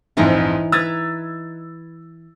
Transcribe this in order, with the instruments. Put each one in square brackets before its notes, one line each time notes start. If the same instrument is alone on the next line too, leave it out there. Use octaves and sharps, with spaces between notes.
[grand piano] A#1 F2 G#2 [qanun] E3 D#4 A#5
[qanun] B4 A#5 [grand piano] E6 G#6 A6